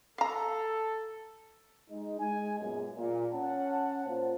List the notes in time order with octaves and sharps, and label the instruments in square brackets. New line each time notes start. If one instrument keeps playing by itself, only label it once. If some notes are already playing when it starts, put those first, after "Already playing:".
[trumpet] A4 [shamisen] F5 A#5
[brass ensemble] G#3 D#4
G#3 G#5
F#2 A#2 B3 G#4
A#2
C#4 F#5 A5
A#2 A#3 F4 C5